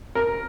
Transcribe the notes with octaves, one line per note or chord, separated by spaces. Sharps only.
A#4